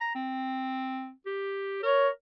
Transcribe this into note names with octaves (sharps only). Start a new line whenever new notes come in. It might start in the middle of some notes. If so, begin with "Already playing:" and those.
A#5
C4
G4
A#4 C#5